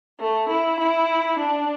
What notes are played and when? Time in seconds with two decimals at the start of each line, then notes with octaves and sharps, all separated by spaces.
0.21 A3
0.50 E4
0.81 E4
1.40 D4